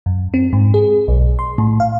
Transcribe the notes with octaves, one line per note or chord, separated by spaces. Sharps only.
F#2
C4
G#2
G#4
B1
C6
A2
F5